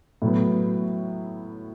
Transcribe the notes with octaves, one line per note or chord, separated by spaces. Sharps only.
A2 F#3 B3